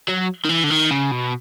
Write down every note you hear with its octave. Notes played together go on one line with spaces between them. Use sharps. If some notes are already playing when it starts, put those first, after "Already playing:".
F#3
D#3
E3
D3
D#3
C#3
B2